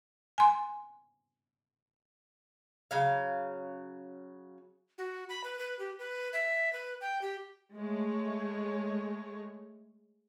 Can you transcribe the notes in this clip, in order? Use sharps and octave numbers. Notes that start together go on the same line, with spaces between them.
G#5 C6
C#3 F#3 F5
F#4
B5
B4
B4
G4
B4
E5
B4
G5
G4
G#3 A3 C#5